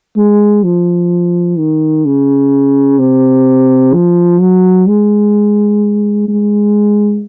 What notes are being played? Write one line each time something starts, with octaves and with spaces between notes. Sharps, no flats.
G#3
F3
D#3
C#3
C3
F3
F#3
G#3
G#3